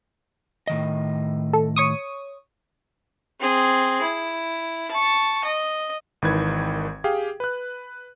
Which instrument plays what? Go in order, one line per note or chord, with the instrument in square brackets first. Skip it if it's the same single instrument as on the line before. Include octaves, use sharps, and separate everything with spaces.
[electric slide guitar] A2 D#3 D#5
[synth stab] A4
C#5 C#6 D#6
[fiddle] C4 G#4
E4
A5 C#6
D#5
[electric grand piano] G#1 D#3 E3 B4 G#6
G4 G#4 F5 G5
B4 F#6